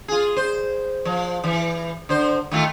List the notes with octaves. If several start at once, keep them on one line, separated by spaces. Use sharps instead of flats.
F4 G#4
C5
F3
E3
D3 C5
D#3 A3 F4